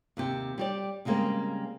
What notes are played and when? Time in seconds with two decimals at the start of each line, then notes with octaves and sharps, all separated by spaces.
0.17 D#2 C3 G4
0.58 G3 G4 D5
1.05 C#3 G3 G#3 A#3 C4